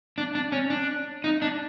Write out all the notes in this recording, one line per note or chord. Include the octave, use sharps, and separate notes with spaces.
D4
D4
C#4
D4
D#4
D4